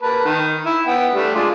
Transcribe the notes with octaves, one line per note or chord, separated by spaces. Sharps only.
A#3 B4 A5
D#3
E4
B3 F#5 G5
G3 A3 D4
G#3 F4 D5